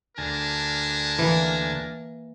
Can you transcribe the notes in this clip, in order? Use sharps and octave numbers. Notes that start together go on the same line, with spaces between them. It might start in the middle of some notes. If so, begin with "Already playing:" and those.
D2 D4 A#4 G#5 A5
E3 A#3